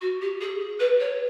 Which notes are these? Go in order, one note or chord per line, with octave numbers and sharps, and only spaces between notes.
F#4
G4
G#4
B4
C#5